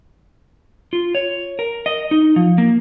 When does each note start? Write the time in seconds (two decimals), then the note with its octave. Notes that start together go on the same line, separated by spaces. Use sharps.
0.93 F4
1.15 C#5
1.59 A#4
1.86 D#5
2.11 D#4
2.36 F3
2.58 A#3